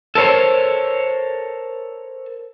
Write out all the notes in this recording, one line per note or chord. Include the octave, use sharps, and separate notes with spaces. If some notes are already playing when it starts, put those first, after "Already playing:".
A4 A#4 C5 C#5